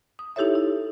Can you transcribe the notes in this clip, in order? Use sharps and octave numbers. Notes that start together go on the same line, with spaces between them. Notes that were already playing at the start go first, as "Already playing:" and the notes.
D#6
D#4 E4 G4 A4 C#5 E5
E4